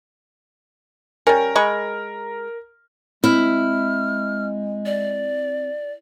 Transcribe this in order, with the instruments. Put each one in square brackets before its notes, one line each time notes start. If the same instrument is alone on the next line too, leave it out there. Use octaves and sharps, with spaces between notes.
[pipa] G3 C#4 [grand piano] A#4
[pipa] G#3 B5 C#6
[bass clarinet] G#3 [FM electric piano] C4 [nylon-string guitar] E4 [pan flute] F6
[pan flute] D5